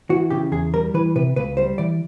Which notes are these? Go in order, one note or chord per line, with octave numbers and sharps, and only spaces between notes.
E3 F#4
C#3 G4
E2 G#4
G3 A#4
E3 B4
C3 B4
C#2 B4
G3 C5
E3 D5